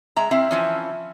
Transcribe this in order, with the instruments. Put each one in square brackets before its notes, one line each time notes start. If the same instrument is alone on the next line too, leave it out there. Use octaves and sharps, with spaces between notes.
[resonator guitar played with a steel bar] G#3 E5 A#5
[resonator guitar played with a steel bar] C4 E4 F5 [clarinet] E5
[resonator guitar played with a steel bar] E3 F3 C#4